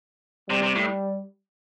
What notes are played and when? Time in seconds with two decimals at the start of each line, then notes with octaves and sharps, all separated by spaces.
0.49 C3 G3
0.63 C3
0.75 A2